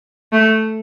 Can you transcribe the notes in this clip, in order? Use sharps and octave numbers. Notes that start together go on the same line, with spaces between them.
A3